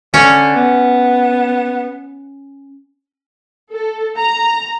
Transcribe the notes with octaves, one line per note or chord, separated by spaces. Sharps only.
D3 C#4
B3
A4
A#5